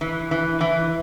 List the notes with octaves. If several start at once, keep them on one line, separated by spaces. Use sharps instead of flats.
E3
E3
E3